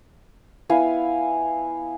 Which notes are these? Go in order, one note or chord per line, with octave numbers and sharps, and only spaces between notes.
B3 E4 F5 G#5